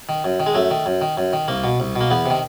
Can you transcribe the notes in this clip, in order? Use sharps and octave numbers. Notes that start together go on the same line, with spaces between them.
D#3
F#2
D#3
G#3
F#2 A3
D#3
F#2
D#3
F#2
D#3
C2 A#3
B2
C2
B2
A#3
E2 B3
C3 D#3